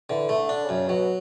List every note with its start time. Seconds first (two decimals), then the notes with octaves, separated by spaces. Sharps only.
0.10 D3 E3
0.29 A3
0.36 D3
0.49 D4
0.63 C#3
0.69 F#2
0.88 B2 F#3